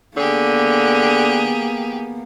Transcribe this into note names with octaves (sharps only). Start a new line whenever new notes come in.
D3 A#3 B3 G4 G#4